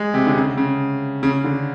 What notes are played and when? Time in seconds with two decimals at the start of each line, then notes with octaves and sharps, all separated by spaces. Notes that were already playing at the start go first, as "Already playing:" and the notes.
Already playing: G#3
0.14 C3
0.27 D3
0.36 C#3
0.58 C#3
1.23 C#3
1.44 D3